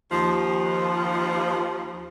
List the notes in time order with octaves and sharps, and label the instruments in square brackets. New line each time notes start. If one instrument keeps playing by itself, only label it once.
[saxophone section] D#2 F3